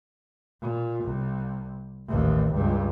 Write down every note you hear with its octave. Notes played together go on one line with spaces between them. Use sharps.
A#2
C2
A1 D#2
C#2 G2